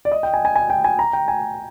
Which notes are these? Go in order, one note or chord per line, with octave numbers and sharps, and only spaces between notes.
D5
D#5
G5
G#5
G#5
G#5
G5
G#5
A#5
G5
G#5